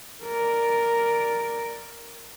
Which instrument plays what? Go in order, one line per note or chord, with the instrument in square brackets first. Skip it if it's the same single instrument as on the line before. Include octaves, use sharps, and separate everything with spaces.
[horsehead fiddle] A#4 D5